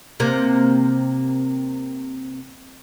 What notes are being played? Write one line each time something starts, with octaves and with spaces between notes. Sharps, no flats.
C3 A#3